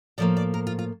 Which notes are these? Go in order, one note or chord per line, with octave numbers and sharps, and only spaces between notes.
A2 F3 A#3 D5
D5
A#4
F4
F4